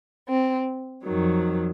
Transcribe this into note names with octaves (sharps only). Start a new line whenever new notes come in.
C4
F2 D#3 F#3